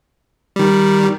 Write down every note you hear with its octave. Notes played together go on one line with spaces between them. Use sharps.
D#3 G3